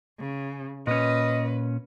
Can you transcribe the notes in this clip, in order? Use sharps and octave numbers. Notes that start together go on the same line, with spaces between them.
C#3
A#2 C#4 B4 D#5